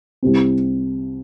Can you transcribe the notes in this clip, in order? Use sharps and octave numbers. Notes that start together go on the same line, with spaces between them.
C2 C3 G3 C4